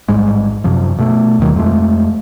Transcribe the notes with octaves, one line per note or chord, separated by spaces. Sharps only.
A1 G#2 G3 G#3
F#2 C3 F3
B2 A3
D#2 B2 D#3 F#3
F2 G#3 A3